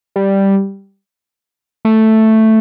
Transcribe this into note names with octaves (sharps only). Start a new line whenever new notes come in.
G3
A3